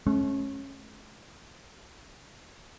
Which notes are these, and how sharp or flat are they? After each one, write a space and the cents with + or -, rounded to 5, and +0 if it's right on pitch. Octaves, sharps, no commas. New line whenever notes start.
A3 -45 C#4 -20